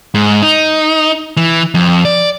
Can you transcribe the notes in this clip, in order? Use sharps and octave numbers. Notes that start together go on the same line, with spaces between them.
G#2
D#4
E3
F2
D5